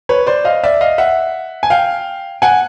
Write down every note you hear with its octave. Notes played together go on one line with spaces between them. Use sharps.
B4 C#5
C5 D5
D#5 F5
D5 E5
D#5 F5
E5 F#5
G#5
F5 G5
F#5 G#5